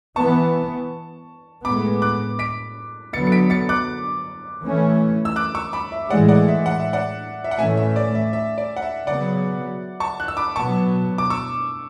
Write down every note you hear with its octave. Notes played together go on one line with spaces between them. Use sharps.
E3 B3 A5 C#6
A2 G#3 B3 B5 D6
D6 F#6
B6 D7
D3 F#3 B3 A6 C#7
C#7
B6 D7
A6 C#7
D6 F#6
E3 A3 C#4
E6
D6 F#6
C#6 E6
B5 D6
E5
A2 E3 G#3 D5 F#5
D5 F#5
E5
F#5
E5
D5 F#5
E5
F#5
A2 E3 A3 C#4 E5 G#5
E5
D5
E5
E5
D5
F#5
E5
C#3 F#3 B3 D5 F#5
A5 C#6
F#6
E6
B5 D6
B2 F#3 B3 A5 C#6
D6
C#6 E6